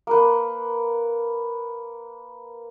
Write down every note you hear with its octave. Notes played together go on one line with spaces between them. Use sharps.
A#3 B4